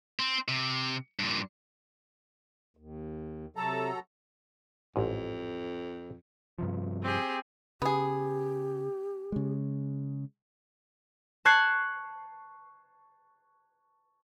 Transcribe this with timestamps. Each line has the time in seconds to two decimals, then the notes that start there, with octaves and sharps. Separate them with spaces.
0.20 C4
0.48 C3
1.19 G2 A#2
2.77 D#2
3.56 C3 F#3 A4 A5 A#5
4.96 A1 F2 G#2
6.59 G2 C3 F3
7.02 C4 G4 G#4
7.82 C#3 B3 G4 G#4
9.32 C#3 G#3
11.45 A5 C#6 F#6 G#6 C7